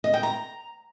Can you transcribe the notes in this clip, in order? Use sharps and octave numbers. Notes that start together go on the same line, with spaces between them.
D#5
G5
A#5